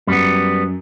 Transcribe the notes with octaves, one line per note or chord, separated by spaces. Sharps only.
F#2 G3 B3